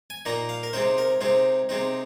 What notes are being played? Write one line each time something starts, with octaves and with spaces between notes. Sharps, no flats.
G#5
A#2 A#3 D#4 A#5
F5
A#4
C3 G#3 C4 D#4 C5
A#4
C3 G#3 C4 D#4
C3 G#3 C4 D#4